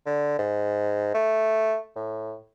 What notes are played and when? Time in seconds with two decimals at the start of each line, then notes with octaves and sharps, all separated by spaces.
0.06 D3
0.39 G#2
1.14 A3
1.96 A2